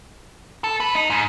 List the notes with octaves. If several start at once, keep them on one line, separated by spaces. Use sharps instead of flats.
A4
B4
D#4
G#2